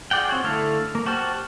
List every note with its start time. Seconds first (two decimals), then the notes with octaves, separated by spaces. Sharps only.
0.11 F4 G#4 D5 F#5 G5
0.29 C4 F#4 C#5
0.44 D3 A3 E4 A4 F5
0.95 A#3
1.06 F#4 G4 C5 A5 F6